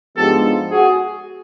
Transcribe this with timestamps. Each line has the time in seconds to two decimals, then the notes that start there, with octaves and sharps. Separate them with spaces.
0.16 G#2 F3 G#3 B3 D4 G4 A4
0.71 F#4 G#4